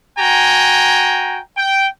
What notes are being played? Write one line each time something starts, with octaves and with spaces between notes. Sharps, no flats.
F#4 G5 G#5 A#5
G5